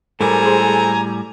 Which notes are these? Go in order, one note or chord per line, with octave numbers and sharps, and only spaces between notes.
A2 G3 G#3 C4 A4 A#4 G#5 A#5
G#4 C5